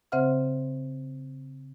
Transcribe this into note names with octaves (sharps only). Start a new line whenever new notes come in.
C#3 C4 C5 E5 F#5 F6